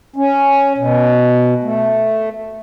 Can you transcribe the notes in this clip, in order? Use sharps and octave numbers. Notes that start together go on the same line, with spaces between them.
C#4
B2
A3